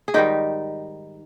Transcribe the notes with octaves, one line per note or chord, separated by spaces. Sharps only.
G#4
G#2 D#3 G3 D#4 G4